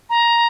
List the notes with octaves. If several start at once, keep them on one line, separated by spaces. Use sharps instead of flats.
A#5